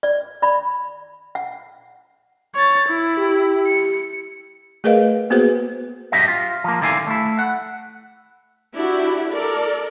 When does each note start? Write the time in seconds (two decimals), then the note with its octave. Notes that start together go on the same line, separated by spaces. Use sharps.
0.03 D5
0.42 D5 B5
1.35 F#5
2.55 C#5 A6
2.88 E4
3.18 G4
3.67 C#7
4.84 A3 G#4 A#4 B4 D#5 F5
5.30 A#3 B3 F#4 G#4 B4 C5
6.12 F#2 D4 G4 D#5 E5
6.28 F4
6.64 F3 A#3
6.81 B1 D3 D#3 E4 F5 G#5
7.07 A3 E4
7.39 F#5
8.74 D4 E4 F#4 G4
9.31 A4 A#4 D5